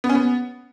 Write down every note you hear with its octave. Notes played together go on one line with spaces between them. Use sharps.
B3
C#4
B3